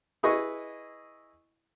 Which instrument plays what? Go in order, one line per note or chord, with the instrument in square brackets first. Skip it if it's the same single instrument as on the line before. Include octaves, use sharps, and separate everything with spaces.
[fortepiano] E4 G#4 B4 D#5 C#6